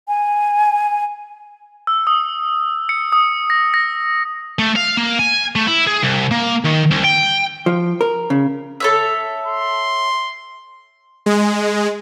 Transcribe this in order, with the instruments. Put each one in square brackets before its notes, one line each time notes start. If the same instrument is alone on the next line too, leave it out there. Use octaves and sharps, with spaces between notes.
[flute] G#5
[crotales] E6
D#6
C#7
D#6
A#6
A#6
[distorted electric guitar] A3
F5
A#3
G#5
A3
E4
G#4
C2
A#3
D#3
C2
G5
[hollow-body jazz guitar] F3
A#4
C#3
[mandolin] A4 C#5 E5
[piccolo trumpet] C6
[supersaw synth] G#3